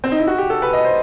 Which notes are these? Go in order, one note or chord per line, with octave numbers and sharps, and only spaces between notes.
C4
D#4
E4
F#4
G4
A4
B4
D#5
C5